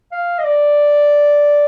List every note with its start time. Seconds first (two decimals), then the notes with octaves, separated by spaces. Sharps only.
0.12 F5
0.39 D#5
0.44 D5